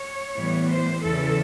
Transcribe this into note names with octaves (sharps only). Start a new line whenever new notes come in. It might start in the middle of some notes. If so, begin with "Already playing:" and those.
Already playing: C#5
A2 E3 G3 B3
C5
E2 C#3 E3 A4